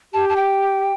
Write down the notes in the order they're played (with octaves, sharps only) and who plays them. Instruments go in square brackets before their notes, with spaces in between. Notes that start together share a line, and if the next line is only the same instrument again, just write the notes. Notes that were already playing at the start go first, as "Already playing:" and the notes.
[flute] G4 [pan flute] A5
[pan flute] A5
G5